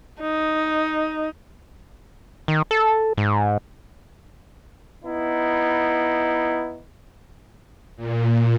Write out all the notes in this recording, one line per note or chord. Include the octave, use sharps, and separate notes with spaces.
D#4
D#3
A4
G#2
B3 D#4 E4
A#2